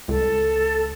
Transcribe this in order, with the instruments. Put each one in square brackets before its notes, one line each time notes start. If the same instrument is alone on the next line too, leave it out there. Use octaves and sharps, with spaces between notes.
[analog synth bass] C#2 [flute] A4